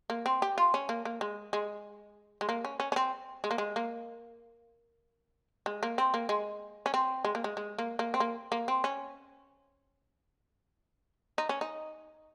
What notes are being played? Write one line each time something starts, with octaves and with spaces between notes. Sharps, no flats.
A#3
C4
G4
F4
C#4
A#3
A#3
G#3
G#3
G#3
A#3
C#4
C#4
C#4
C4
G#3
A#3
G#3
A#3
G#3
A#3
C4
A#3
G#3
C#4
C4
G#3
A#3
G#3
G#3
A#3
A#3
C4
A#3
A#3
C4
C#4
D#4
C#4
D#4